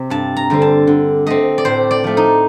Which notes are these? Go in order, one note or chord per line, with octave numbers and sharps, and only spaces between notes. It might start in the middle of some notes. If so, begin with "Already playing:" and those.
Already playing: C3 C4
G2 A5
A#5
D3 G3 C4
A5
D3
A3 C4 D#5
D5
A2 C5
D5
F3 A3
D#4